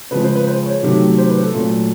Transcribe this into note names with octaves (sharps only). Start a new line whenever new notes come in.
C#3 F3 G#3 B4
C5
B4
C5
C#5
C3 D#3 F#3 A3
C5
B4
A4
A#2 F#3 A3